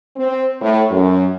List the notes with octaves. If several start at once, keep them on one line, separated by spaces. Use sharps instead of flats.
C4
A2
F#2